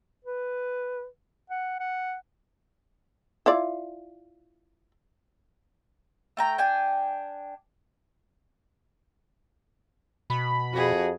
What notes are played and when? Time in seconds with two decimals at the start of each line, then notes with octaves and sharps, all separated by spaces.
0.25 B4
1.50 F#5
1.80 F#5
3.46 E4 F4 D5
6.37 A3 G5 A#5
6.58 D4 G5 G#5
10.30 B2 B5
10.73 F2 F#4 G#4